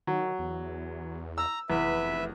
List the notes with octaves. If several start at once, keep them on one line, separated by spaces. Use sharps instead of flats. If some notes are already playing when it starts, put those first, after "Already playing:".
D#3 F#3
E2
A#5 E6
F1 E2 B4 E5